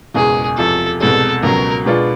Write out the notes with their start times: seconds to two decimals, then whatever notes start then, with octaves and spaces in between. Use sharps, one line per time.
0.14 F#1 E2 B2 G#3 G#4
0.58 E2 C3 F3 A4
1.00 C2 B2 G#3 A4
1.43 C#2 B2 F#3 A#4
1.86 B2 G#3 B3 D4 F4